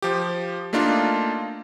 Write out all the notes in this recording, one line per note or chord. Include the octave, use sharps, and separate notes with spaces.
F3 G4
A3 A#3 D4 D#4 F4